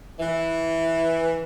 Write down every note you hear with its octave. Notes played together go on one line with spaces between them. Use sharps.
E3